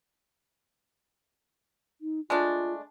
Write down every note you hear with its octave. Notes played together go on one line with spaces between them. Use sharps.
D#4
G#3 A3 D4 F4